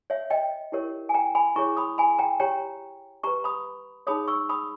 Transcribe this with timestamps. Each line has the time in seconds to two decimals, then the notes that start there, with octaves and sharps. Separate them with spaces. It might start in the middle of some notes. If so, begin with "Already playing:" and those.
0.10 C#5 E5
0.30 D#5 G5
0.72 E4 G4 A#4 C#5
1.09 G#5
1.14 G5 A#5
1.35 G#5 B5
1.56 E4 G#4 C#5 A#5 C#6
1.77 B5 D#6
1.98 G#5 B5
2.19 G5 A#5
2.40 G4 C#5 G5 A#5
3.23 G4 B4 A#5 C#6
3.44 B5 D#6
4.07 D#4 G#4 C#5 B5 D#6
4.28 C#6 E6
4.49 B5 D#6